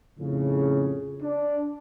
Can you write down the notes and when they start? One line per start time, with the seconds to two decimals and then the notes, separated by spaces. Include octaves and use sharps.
0.19 F2 A2 C#3
1.22 D4 D5